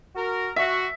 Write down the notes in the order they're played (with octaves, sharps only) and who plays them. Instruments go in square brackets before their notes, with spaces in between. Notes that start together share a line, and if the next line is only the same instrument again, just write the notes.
[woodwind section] F#4 A#4
[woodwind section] F#4 [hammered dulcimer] E5